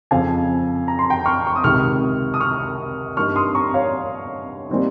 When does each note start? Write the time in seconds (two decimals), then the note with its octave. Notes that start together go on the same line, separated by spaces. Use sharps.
0.11 F2 C#3 F3 F5 G#5
0.88 A#5
0.99 C6
1.10 G5 A#5
1.26 C#6 F6
1.47 C#6
1.56 D#6
1.64 C#2 C3 D#3 C#6 F6
2.34 D#6
2.40 C#6 F6
3.17 G2 G3 A#3 D#4 C#6 F6
3.36 C6 D#6
3.55 A#5 C#6
3.74 C#5 F5
4.69 A#2 G3 C4 D#4